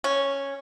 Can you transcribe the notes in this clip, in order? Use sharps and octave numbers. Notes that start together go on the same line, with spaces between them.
C#4